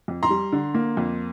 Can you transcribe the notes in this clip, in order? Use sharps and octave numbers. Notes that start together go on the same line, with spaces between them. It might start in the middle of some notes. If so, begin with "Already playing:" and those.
F2
A#5 C6
G3
D3
A#3
F2